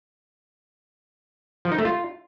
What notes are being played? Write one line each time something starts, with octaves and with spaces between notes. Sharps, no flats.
F3
D#4
A3
F4